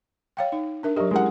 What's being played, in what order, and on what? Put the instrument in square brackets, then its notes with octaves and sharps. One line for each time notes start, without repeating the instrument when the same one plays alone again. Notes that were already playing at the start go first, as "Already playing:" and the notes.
[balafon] C#5 F5 G5
D#4
D4 A#4 E5
[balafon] F#3 G4 [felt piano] A#4 D#5 E5
[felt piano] G#3 A#4 F#5 [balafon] C#4 E4 G4